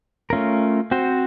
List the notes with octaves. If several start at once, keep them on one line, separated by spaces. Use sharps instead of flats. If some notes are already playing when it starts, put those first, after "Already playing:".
A3 C#4 F4 A#4
C4 F#4 C5